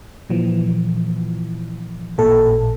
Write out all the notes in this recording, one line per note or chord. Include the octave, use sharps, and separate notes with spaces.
A#2 E3 F3
A1 A#2 A4